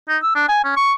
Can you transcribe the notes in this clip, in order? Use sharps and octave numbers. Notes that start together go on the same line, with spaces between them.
D#4
E6
D4
G#5
C#4
C#6